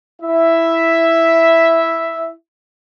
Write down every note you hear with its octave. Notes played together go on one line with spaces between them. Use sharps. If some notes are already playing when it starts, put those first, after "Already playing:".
E4 E5